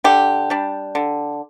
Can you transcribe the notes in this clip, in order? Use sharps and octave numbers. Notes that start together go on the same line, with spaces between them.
D3 G4
G3 D4
D3